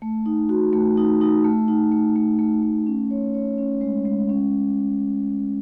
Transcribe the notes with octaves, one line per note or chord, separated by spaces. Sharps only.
A3
D#4
F#4
A3
D#4
D#4
A3
D#4
A3
A3
A3
A3
C#4
C#5
C#5
C#4
G#3
G#3
C#4